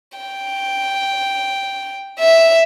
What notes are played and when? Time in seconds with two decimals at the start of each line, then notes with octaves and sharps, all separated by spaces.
0.18 G5
2.19 E5